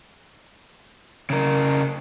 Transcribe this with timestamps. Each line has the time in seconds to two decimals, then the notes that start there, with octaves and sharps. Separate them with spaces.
1.30 C#3 A#4